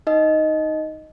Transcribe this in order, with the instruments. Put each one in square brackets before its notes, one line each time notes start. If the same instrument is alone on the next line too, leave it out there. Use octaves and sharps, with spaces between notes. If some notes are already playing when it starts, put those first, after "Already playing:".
[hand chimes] D#4 D#5